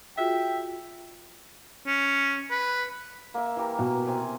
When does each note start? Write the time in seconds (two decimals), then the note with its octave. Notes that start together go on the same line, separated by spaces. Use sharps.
0.18 F4 F#4 G#4 E5 G5
1.87 C#4
2.51 B4
3.34 A#3 E5
3.56 E3 G4 A#4
3.79 B2
4.07 C3 C4 G#5